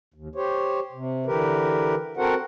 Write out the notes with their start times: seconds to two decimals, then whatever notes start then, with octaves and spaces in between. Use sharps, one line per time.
0.14 D#2
0.35 G4 C5 C#5
0.93 C3
1.26 D3 E3 G4 A#4 B4
2.17 C4 F#4 A4 A#4 C5 F#5